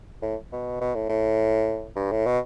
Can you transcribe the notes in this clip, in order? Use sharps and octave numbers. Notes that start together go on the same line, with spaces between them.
A2
B2
B2
A2
A2
G2
A2
B2